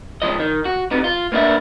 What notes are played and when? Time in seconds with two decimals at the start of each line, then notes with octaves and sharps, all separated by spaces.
0.22 G#2 F3 D#5
0.40 D#3
0.65 F#4
0.91 C3 B3 D#4
1.04 F4
1.32 A#3 B3 D4 D5 E5